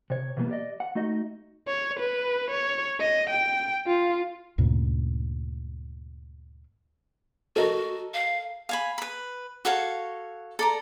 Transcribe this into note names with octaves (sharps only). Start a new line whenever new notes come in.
C3 C#5
B2 E3 G3 G#3 A#3 B3
G4 D5 D#5
F#5
A3 D#4 F#4 D#5
C#5
B4
C#5
D#5
G5
F4
D2 G2 A#2 C#3
F#4 A4 A#4 D#5
F5
F5 G#5 B5
B4 B5
F#4 A4 C#5 F5
A4 D5 A#5